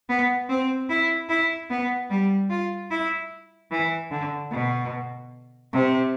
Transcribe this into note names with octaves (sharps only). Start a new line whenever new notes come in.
B3
C4
E4
E4
B3
G3
F4
E4
E3
D3
B2
C3